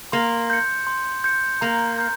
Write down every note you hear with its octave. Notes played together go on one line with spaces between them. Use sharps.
A#3 C6
G6 C#7
C6
G6 C#7
A#3 A#5
G6